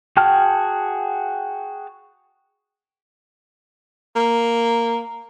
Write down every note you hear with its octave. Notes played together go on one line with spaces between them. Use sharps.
F#4 G#4 G5 A5 F6
A#3